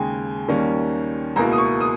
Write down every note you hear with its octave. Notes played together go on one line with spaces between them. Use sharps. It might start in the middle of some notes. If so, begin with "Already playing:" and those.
Already playing: D#2 C#3 G#3 G5 G#5
D#2 D#3 G3 A#3 C#4
C#2 B2 A#3 E4 A#5
D#6
C#6
D#6